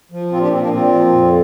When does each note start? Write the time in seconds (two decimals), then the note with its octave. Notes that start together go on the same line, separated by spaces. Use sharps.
0.12 F3
0.32 A#2 C4 F4
0.41 D4 G4
0.52 F3 C4
0.62 A#3 D4
0.72 A#2 C4 F4
0.93 F3
1.13 F2